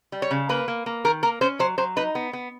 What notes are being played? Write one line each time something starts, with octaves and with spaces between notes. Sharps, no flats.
G3
C#5
C#3
A#3 B4
A#3
A#3
D#3 A#4
A#3 A#4
C#4 C5
F#3 C5
F#3 C5
D#4 B4
B3
B3